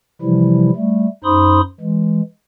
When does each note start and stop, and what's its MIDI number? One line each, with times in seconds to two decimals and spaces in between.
0.21 0.70 48
0.21 0.70 52
0.21 0.70 53
0.21 0.70 55
0.21 0.70 64
0.76 1.07 55
0.76 1.07 57
1.24 1.61 42
1.24 1.61 63
1.24 1.61 72
1.24 1.61 83
1.24 1.61 84
1.24 1.61 87
1.80 2.21 52
1.80 2.21 56